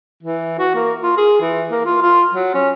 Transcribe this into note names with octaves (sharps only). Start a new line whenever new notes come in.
E3
F#4
A#3
F4
G#4
E3
A#3
F4
F4
F#3
C#4